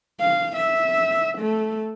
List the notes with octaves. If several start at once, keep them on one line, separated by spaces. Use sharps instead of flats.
F5
E5
A3